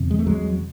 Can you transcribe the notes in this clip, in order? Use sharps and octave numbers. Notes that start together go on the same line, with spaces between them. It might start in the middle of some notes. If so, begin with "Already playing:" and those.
Already playing: E2 C3
G#3
A3
F#3 G#3